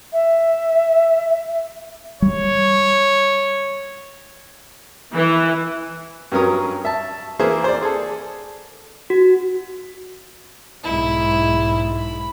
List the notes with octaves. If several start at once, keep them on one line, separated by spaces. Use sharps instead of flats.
E5
G3 C#5
E3
G2 F#3 C#4 A#4 D#6
E5 A5
E3 A#3 G#4 C5 E5
C5 D5
G#4 A4
F#4
B1 G#2 E4
B5